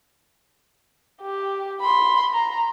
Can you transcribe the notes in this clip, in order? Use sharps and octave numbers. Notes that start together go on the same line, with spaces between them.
G4
B5 C6
A#5